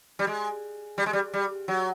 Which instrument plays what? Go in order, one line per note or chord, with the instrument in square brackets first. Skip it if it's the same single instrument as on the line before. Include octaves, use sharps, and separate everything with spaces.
[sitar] G3
G#3
G3
G#3
G3
G3
F#3